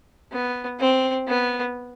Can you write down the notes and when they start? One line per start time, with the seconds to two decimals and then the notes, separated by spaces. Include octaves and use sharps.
0.32 B3
0.80 C4
1.28 B3